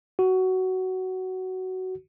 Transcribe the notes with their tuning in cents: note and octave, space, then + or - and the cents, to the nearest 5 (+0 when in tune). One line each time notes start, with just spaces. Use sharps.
F#4 +15